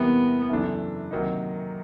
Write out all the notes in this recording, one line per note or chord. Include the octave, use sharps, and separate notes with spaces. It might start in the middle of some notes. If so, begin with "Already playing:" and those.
Already playing: E2 C3 E3 G3 A#3 B3
F#2 C#3 E3 A3 D4
C3 D#3 F#3 A#3 D#4